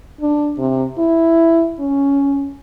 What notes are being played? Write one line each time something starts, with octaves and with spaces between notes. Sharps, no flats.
D4
C3
E4
C#4